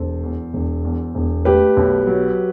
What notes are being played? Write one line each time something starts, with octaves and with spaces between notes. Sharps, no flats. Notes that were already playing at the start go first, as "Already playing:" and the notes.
Already playing: E1 A4 C5
E2
E1
E2
E1
A3 G4 B4
B1
F#3